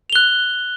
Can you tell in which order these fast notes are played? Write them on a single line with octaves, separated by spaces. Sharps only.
F7 G7 F#6